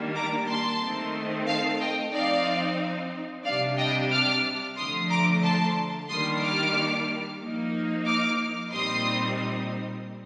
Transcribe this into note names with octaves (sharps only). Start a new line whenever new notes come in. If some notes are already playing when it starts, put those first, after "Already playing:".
Already playing: D#3 G3 A#3 D4
A#5 D6
A5 C6
D#3 A3 C4 D#4
F5 A5
D#5 G5
F3 C4 D#4 D5 F5
C3 G3 D4 D5 F5
D#5 G5
D6 F6
D3 F3 A3 C6 D#6
A#5 D6
A5 C6
D#3 G3 A#3 D4 C6 D#6
D6 F6
F3 A#3 D#4
D6 F6
A#2 G3 C4 D#4 C6 D#6